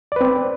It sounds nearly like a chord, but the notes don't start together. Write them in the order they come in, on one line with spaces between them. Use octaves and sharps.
D5 B4 C4